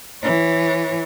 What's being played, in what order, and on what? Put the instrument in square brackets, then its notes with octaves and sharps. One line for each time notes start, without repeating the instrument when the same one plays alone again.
[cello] E3 C#5